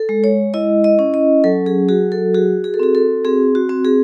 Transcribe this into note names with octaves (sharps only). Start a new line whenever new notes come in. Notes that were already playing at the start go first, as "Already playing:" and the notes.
Already playing: A4
G#3
C#5
E4 D#5
D#5
C#4
D#5
F#3 A4
G#4
F#4 G#4
A4
F#4 G#4
G#4
A4
C4 G#4
A4
C4 G#4
F#4
C4
G#4